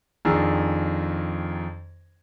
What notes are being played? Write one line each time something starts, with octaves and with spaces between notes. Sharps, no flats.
F2 D#3 D4 G#4 A#5 E6